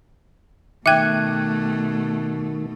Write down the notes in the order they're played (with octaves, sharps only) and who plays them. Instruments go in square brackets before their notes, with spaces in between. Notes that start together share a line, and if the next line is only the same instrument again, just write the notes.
[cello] B2 A3 [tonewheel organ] D#3 [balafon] E5 G5 [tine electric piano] D6 F#6 G#6